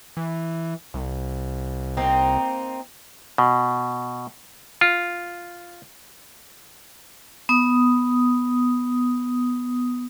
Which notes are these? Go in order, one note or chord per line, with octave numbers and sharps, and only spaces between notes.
E3
C2
A#3 C4 D#4
B2
F4
B3 D#6